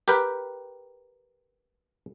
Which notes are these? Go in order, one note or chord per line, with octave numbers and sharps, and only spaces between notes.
G4 A#4 B4 G5